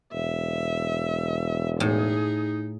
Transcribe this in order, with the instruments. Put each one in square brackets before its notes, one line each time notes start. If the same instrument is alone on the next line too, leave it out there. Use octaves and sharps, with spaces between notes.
[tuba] E1 [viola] E5
[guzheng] A2 [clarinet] D#4 [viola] G#4